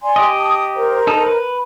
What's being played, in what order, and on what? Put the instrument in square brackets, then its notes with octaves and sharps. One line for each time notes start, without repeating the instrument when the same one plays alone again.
[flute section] D5 G#5 C6
[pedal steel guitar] G4 D#5
[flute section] A5 D#6
A#4 C5 A#5
[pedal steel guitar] D#4 A4
B4